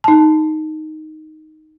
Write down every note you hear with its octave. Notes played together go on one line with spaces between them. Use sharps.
D#4 A5